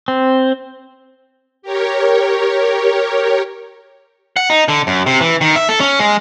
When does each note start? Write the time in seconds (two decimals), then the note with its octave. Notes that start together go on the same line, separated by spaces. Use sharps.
0.08 C4
1.62 G4 A#4 C#5
4.37 F#5
4.50 D#4
4.68 D3
4.87 F#2
5.06 C3
5.20 E3
5.41 D#3
5.56 E5
5.69 A4
5.80 C#4
5.99 G#3